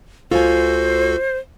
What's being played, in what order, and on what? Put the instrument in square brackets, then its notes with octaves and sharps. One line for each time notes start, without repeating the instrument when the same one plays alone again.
[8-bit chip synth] C#2 F#4 A4 [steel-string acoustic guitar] F4 G#5 [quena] C5